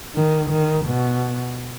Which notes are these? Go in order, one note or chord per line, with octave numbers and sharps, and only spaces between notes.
D#3
D#3
B2